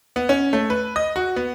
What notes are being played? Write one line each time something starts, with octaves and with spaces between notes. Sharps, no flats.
B3
C#4
A3
B4
D#5
F#4
B3